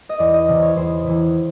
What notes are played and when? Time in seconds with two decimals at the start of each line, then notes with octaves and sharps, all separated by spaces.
0.09 D#5
0.19 E2 D5
0.34 D#5
0.48 C3 E3 D5
0.62 C#5
0.76 E2 C5
1.05 C3 E3